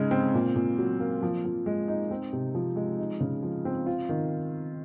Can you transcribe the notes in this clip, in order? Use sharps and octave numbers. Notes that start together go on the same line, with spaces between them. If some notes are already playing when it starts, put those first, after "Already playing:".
Already playing: C#3 G#3 D#4
C4
A#2
A#2
F#3
A#3
F3
F3
G#3
D#4
C4
C3
F3
G#3
D#4
C#3
F3
C4
F4
D#3